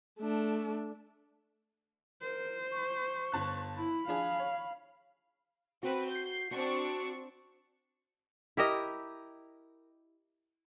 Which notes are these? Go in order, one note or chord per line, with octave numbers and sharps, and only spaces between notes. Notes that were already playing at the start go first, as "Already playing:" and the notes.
A3 D4
A#4 C5
C#6
G1 A5 F#6
E4 B5
F3 D4 G#4 F5
C#5
C4 F#4 B4
G6 C7
C4 D4 F#4 C#6
E4 G4 A#4 D#5